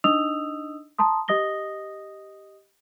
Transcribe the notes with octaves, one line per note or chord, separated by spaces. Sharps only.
D4 D#4 D#5 D#6 E6 F7
A5 A#5 C6 D#6
G4 D#5 D#6 A#6 G7